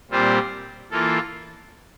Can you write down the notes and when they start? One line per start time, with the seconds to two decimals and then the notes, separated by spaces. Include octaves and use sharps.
0.11 A#2 G3 C4 F4 C5
0.91 E3 A#3 F4 A4